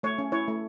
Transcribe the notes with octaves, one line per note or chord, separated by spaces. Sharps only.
A3 C#5
C#4
E4 C#5
A3